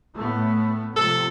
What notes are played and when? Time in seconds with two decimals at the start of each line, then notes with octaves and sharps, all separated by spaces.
0.15 A2 A3 B3
0.96 C3 F3 A4